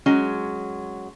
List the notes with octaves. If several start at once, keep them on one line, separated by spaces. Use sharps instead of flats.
F#3 G#3 C#4